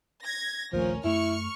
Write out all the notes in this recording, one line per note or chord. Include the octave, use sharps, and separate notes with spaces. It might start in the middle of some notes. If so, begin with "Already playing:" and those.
G#6 A#6
A#1 D#2 F3 A3 C#4 A#4
F#2 A3 E4 C#6 F6 C#7